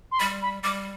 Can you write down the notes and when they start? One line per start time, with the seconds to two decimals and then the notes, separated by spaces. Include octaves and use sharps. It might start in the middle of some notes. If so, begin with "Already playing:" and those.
0.12 C6
0.19 G3 B5
0.42 B5
0.63 G3 D6